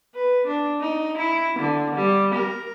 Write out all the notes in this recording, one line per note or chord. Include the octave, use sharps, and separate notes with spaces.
B4
D4
D#4
E4
D3
G3
A#4